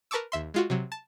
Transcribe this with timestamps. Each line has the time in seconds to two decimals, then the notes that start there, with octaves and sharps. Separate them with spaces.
0.11 A#4 B4 A5 C#6 D6 E6
0.32 D#2 E5 C6
0.54 G#3 F4 F#4
0.70 C3 F#3
0.92 A5